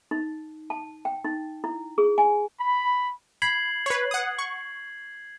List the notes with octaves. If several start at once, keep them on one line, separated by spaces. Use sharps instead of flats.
D#4
A5
G5
D#4
E4
G#4
G#5
B5
B5 G#6 C7 F#7
B4 C#5
F#5 D#6
C#6